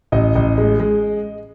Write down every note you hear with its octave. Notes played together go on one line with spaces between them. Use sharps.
A1 D#5
A1
G#3
G#3